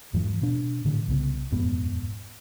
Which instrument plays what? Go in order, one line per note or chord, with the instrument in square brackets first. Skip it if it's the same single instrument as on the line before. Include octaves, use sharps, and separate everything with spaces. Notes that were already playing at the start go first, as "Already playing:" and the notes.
[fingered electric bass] E2 G#2 E3 F#3
B2 D4
A2 D3 E3
C2 C#3 B3
D#1 F2 G#2 B3